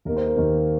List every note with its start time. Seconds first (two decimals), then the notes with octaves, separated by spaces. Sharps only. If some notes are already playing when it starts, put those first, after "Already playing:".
0.05 D#2 D#3 A#3 A#4
0.17 C5
0.26 A#4
0.36 D#2 D#3 A#3